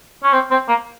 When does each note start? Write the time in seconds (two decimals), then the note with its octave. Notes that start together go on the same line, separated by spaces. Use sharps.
0.23 C#4
0.33 C4
0.51 C4
0.68 A#3